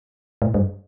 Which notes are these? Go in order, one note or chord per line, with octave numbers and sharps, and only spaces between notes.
A2
G2